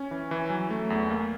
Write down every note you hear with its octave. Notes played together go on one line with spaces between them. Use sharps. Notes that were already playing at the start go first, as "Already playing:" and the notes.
Already playing: C#4
E3
E3
F#3
A3
E2
A#3